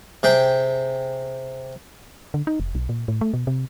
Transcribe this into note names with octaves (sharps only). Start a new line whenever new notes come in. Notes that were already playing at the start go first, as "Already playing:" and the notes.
C3 G#4 G5
D3
D#4
F1
B1
A#2
A2
A3
B2
C3